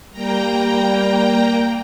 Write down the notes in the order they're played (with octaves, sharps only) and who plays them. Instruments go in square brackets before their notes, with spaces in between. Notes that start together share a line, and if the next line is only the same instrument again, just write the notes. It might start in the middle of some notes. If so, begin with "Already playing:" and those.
[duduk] G3 [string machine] A#3 G5 A#5